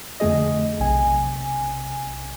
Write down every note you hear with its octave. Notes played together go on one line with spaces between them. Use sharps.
F2 D3 A3 G#4 D#5
B1 C3 G#5